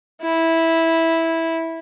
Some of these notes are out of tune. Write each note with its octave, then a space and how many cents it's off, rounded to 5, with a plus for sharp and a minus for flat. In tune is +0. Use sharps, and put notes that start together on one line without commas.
E4 -10